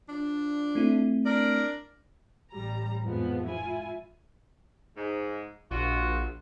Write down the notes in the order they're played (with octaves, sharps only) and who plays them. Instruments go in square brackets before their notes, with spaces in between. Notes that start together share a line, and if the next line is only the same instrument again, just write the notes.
[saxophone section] F3 D4
[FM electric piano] A3 C4 E4
[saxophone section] D4 D5 [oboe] A#4
[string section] A1 G3 A#5
F2 G#2 E3 F3 G#3 B3
E4 F4 G#5
[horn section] G#2
[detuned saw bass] A#1 [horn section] F4 F#4